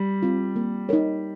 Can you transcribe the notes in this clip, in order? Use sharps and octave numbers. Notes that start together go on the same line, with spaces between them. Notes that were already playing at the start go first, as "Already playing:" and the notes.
Already playing: G3
C4 F4
A#3
D#4 A#4 C#5